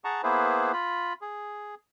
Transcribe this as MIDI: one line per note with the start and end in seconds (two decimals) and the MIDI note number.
0.04 0.22 68
0.04 0.22 78
0.04 0.22 81
0.04 0.22 82
0.04 0.22 85
0.23 0.72 58
0.23 0.72 59
0.23 0.72 64
0.23 0.72 68
0.23 0.72 71
0.23 0.72 72
0.73 1.13 65
0.73 1.13 83
1.22 1.75 68